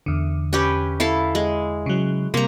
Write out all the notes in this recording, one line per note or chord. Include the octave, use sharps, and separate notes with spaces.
E2 D3
C#4 G4 B4
E4 A4 F5
G#3
C#3 F#3
C3 G3 A#3 A#5